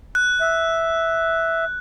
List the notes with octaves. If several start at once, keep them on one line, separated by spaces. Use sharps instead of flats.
F#6
E5